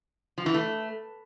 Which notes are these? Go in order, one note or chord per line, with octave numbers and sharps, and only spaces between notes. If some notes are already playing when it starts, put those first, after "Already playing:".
F3
E3
A3